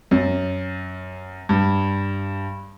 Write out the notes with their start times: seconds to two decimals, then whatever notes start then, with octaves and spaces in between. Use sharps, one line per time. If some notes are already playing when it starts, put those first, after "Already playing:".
0.11 F#2
1.49 G2